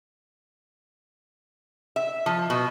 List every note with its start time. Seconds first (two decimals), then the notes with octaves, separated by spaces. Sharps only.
1.96 E5
2.26 F3
2.50 B2